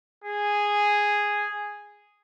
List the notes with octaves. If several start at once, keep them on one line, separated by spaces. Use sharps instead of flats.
G#4